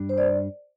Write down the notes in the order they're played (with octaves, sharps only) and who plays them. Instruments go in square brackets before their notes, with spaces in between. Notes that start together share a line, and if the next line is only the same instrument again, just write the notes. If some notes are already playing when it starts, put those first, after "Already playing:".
Already playing: [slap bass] G2 G3 D4
[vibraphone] C5
D5